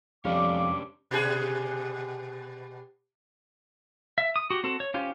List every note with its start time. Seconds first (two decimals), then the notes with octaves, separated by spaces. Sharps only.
0.25 F2 G3 C#4 D4 G4 F5 D6
1.11 B2 G4 G#4
4.18 E5
4.36 D#6
4.50 F#4 G4
4.64 C4 F#4 A4
4.80 C#5
4.94 C#4 F4 G4 C5